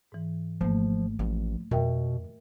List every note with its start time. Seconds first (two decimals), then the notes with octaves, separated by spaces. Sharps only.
0.12 G#2 E3
0.61 G#1 F3 A3 A#3
1.19 A1 F3
1.71 F2 B2 D3 A#4 E5 G5